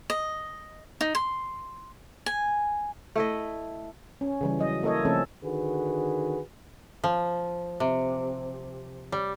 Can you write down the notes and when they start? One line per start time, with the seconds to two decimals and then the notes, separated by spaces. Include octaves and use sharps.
0.10 D#5
1.01 D#4
1.15 C6
2.26 G#5
3.16 A3 E4 D#5
4.21 C#4
4.41 C#3 E3 G3
4.59 F#3 D#5
4.83 A#3 E4 A4 C#5 D#5
5.05 C#3 F3 A3 C4 C#4 A4
5.43 D3 D#3 F#4 G#4 B4
7.04 F3
7.80 C3
9.12 G3